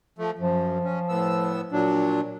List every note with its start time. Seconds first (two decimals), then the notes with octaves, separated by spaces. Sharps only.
0.19 F3 A3
0.39 F#2 F3
0.84 C#4
1.09 A2 B3 E6
1.72 A#2 F#3 D4